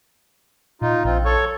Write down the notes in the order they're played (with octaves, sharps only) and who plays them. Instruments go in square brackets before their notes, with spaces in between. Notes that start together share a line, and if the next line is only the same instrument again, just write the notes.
[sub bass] A#2 [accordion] D#4 F4
[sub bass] A#1 [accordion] C4 F4
[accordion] A4 C#5 C#6